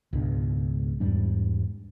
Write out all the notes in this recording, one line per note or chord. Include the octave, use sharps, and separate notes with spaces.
C#2 G#2 B2 D4
E2 G#2 G3 D4